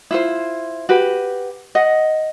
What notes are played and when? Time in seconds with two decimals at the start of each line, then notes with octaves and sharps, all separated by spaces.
0.11 E4 F4 C5
0.89 F#4 G4 B4
1.75 D#5 F#5